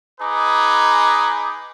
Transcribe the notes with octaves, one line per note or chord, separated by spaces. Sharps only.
D#4 G#4 B4 D6